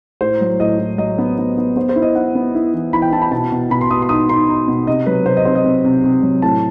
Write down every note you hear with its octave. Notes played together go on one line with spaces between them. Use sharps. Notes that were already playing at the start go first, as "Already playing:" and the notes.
A2 C5
F#3
A2 D#5
A2
F#3 D#5
B3
B3
B3
B3 C5
C5
E4
D#5
E4 F#5
B3
E4
E3
E3 B5
G5
E4 A5
B5
B2 A5
B2
B2 B5
C6
B2 D#6
C6
D#4 D#6
D#4 C6
D#4
B2
C3 D#5
F#3 B4
C3 C5
D#5
C4 C5
D#5
C4
C3
C3
F#3
A2 A5